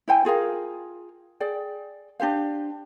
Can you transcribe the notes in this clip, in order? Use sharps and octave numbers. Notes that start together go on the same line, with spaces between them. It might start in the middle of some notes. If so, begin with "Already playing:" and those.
E4 C5 G5 G#5
F4 G#4 A#4 F5
G#4 D5 G5
D4 G4 C5 F5